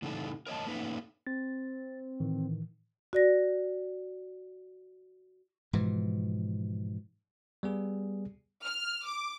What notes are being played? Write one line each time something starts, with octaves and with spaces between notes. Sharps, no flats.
A2 C#3 E3 G3 D#4 A4
A#4 C#5 D#5 A5
A3 A#3 C#4 D#4 B4
C4 A6
A2 D#3 E3
F#4 D5 A#6
G#2 B2 E3 F3
G3 B3 G#4
F6
D6